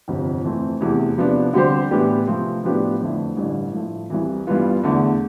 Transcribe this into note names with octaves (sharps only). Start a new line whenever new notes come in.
G1 F2 C3
F2 E3 A3 C4
E2 C3 E3 A3
C3 F3 B3 D4
D3 G3 C4 G4 C5
A2 E3 B3 D4 G4
C3 F3 A3 C4
A2 F3 B3 D4 G4
F2 D3 A3 E4
A1 G2 D3
A2 F3 A3
C2 C3 E3
G2 E3 B3 F4
E2 D3 A3